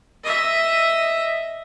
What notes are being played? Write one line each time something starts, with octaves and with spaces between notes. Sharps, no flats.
D#5 E5